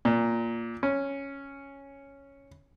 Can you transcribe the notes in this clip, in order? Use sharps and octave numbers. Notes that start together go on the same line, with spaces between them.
A#2
C#4